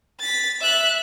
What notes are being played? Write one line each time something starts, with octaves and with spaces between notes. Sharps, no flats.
A6 B6
E5 F#6